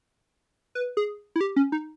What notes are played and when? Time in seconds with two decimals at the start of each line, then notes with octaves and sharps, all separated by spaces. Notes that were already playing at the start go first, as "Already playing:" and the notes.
0.75 B4
0.97 G#4
1.36 E4
1.41 G4
1.56 C#4
1.72 D#4